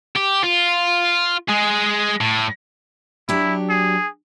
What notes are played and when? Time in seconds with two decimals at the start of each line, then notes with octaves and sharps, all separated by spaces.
0.16 G4
0.44 F4
1.48 G#3 G#4
2.21 A2
3.29 F#3 D4 E4 G4
3.69 G#4